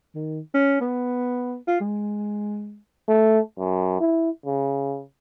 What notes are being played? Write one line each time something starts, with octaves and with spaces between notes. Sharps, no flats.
D#3
C#4
B3
F4
G#3
A3
F#2
E4
C#3